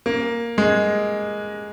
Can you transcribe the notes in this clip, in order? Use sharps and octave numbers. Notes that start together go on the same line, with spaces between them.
A#3
G#3